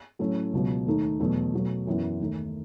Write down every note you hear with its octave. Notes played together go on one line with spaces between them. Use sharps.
A2 F#3 A3 C#4 E4
C#2 B2 F#3
D#2 D#3 A3 D#4
E2 B2 F#3 A3 E4
B2 F#3 A3
F#2 E3 B3 E4
D#2 D#3 A3 D#4